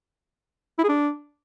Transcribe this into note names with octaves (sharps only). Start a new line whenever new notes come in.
E4
G#4
D4